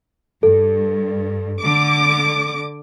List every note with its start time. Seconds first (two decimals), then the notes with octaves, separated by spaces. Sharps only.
0.43 G2 A4
1.61 D3 D6